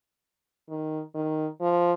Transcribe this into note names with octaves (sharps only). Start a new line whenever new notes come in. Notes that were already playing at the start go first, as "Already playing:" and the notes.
D#3
D#3
F3